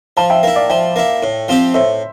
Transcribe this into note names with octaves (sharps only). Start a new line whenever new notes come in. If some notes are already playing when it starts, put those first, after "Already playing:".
F3 F5 A5
E5 G5
A#3 E4
D5 F5
F3 E5 G5
A#3 E4
A2
F3 C4 G4
A2 C5 E5